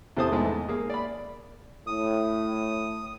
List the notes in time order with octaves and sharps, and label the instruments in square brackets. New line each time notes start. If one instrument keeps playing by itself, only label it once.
[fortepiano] E2 C3 A4 C5 A5 D#6
E2 G#2 B2 G#3 A3 B3
A#3 G#4
D5 B5
[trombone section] A2 [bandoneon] D#6